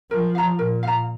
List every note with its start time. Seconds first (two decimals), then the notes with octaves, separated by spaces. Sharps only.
0.10 F3 A#4
0.35 F5 A#5
0.58 A#2 A#4
0.83 F5 A#5